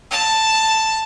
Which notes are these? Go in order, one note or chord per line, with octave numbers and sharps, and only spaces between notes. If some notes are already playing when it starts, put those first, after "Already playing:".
A5